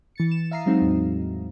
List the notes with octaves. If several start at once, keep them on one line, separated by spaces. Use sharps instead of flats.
E3 A6 C#7
E7
E5 F5 A#5 D#6 C7
F#3 G#3 C4 D#4 F#4
E2 A2